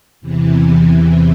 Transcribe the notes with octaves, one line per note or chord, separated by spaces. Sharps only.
E2 C3 E3